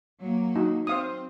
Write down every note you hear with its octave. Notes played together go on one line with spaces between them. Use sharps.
F#3 A#3
D#4 F#4
C4 C5 F5 D#6